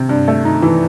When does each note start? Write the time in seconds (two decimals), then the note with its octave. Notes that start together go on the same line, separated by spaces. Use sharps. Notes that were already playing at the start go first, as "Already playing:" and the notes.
Already playing: C3
0.09 G2
0.28 A3
0.45 D#4
0.62 E3